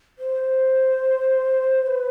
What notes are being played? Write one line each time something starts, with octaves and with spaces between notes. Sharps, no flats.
C5
B4